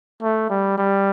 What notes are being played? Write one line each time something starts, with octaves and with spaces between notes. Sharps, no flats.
A3
G3
G3